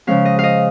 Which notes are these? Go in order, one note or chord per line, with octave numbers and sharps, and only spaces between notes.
C#3 F3 G#3 C#4 F5
D#5
D#5 F5